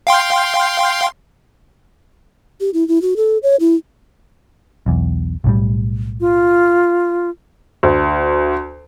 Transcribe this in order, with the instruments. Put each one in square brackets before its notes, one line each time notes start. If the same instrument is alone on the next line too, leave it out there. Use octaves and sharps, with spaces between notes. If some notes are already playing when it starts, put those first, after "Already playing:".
[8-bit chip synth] F5 G5 C6
[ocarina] G4
E4
E4
F#4
A4
C#5
E4
[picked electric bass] B1 E2
B1 A2 G3
[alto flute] F4
[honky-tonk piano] D2